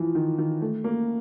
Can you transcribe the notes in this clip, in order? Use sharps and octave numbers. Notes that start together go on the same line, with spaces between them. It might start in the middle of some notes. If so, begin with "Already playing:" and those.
Already playing: E3 F3
D#3
D#3
A3
A#3